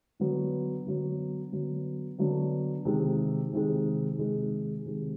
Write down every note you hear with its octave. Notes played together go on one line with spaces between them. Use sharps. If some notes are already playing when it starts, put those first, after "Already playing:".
D3 F#3 B3
D3 F#3 B3
D3 F#3 B3
D3 F#3 B3
C3 D#3 G#3
C3 D#3 G#3
C3 D#3 G#3
C3 D#3 G#3